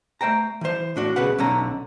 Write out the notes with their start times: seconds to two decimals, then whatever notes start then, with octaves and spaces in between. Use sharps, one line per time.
0.21 A3 C5 G5 A#5
0.61 E3 C5
0.96 A2 D4 F#4
1.16 B1 C#3 B4 F#5
1.39 B1 D3 C#4 A#5